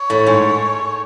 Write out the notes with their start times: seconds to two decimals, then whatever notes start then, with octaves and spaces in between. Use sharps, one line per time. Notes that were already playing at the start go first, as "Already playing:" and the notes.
Already playing: C#5
0.10 A2
0.27 G#2